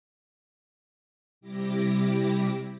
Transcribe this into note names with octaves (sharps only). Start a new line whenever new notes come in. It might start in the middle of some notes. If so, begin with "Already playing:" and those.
C3 G3 E4 G4 D6 A#6